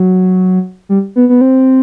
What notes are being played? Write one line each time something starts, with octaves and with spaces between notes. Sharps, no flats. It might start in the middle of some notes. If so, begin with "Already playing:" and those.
Already playing: F#3
G3
B3
B3
C4